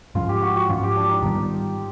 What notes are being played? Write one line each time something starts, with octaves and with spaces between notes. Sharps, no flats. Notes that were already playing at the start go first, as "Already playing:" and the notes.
G#2 F3 G#3 C#4 F4
G4
F#4
F#4
G#2 F3 G#3 C#4 F4
G4
D4
D#4
G#2 D#3 G3 B3